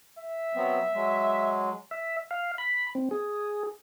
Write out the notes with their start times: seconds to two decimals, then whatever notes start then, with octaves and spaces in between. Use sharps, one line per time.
0.19 E5
0.55 F#3 B3 C4
0.93 F#3 G#3
1.91 E5
2.31 F5
2.58 B5
2.95 C4
3.11 G#4